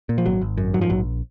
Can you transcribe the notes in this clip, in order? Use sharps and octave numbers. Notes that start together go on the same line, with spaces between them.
A#2
F3
G#1 F#3
G#1
F#2
G#2 F#3
F3
A#1 F#3